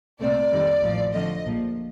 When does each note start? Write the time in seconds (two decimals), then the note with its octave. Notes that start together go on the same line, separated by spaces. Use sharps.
0.19 C2 A#2 A3 C4 D5
0.51 F2 D#3 G3
0.81 A1 A2 F3
1.12 F2 D3 F3 A3 D#5
1.44 A#1 A#2 F3